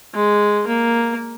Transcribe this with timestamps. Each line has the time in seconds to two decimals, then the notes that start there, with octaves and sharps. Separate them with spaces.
0.15 G#3
0.67 A#3